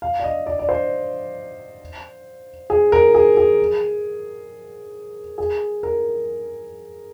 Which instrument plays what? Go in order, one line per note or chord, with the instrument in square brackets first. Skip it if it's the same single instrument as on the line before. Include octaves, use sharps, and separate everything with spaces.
[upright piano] F5
D5
D#5
D5
D5
C5
G#4
A#4
G#4
G#4
G#4
A#4